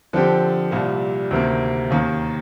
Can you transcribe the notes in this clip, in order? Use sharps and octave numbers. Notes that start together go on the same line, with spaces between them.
D3 F3 C4 G4
C2 A#2 G3
D2 C3 D#3 A#3
D#2 D#3 A#3